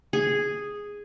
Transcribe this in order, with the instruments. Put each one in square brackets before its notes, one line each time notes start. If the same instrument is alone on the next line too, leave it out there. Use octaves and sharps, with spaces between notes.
[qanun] G#4